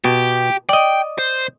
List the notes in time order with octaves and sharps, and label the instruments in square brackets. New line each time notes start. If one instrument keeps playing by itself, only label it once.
[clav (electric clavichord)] B2 [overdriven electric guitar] G4
[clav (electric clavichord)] D5 D#5 [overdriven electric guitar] G5
[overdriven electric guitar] C5